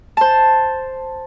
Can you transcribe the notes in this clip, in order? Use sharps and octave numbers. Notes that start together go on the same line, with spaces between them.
C5 A5